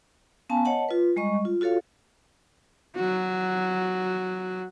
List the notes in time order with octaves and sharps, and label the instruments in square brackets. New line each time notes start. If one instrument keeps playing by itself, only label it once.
[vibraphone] B3 C#4 F5 G#5 A5
C#5 D#5 F#5 A5
F4 B4
G3 G#3 D#5 C#6
F4
F4 F#4 A4 C#5 F5
[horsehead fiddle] F#3 F#4